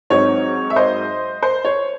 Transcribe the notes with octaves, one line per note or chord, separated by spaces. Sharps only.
G#2 F#3 C4 D#4 C#5
E5
C5 D#5
C5
C#5